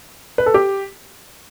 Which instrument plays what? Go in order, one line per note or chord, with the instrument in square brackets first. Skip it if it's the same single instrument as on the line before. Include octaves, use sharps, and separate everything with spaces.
[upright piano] B4
A4
G4